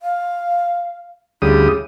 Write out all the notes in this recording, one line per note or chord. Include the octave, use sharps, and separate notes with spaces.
F5
D2 C#3 G3 E4 D#6